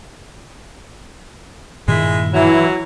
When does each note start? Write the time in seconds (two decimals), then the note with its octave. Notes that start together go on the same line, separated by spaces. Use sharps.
1.88 G2 A#2 D#3 G#3 E4 G#4
2.34 E3 F#3 E4